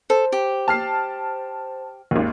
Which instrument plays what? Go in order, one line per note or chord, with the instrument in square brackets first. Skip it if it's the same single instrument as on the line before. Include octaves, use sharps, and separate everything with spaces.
[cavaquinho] A4 [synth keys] C5
[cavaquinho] G4
[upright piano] A5 F6 C7
G#1 D#2